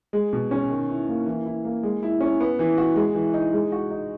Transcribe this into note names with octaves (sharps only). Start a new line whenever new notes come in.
G#3
B2
C#4
D#3
E4
A#3
E3
E4
A#3
G#3
E4
C#4
B3
E3
F#4
G#3
E3
D#4
G#3
F#4
D#4